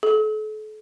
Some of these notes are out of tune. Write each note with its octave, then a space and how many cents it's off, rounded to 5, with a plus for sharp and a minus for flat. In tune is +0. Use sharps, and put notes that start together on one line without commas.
A4 -40